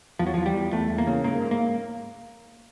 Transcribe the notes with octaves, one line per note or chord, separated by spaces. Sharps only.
E2 F3
F#3
E2 F3
G3
E2
E2 A3
E2
A#3
C#3
G#2 A#3
G#2
A#3